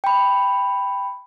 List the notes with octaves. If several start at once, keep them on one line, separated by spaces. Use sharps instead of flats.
G5 B5